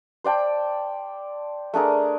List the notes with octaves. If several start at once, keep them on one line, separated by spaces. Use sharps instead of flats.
C5 D5 G5 A5
A3 D4 G#4 A#4